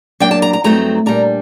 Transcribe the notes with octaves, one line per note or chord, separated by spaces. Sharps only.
F#2 F#3 A#3 D4 G5
A5
A#5
A#5
G2 F#3 A3 C4 D#4 A#5
A#2 G3 D4 A#5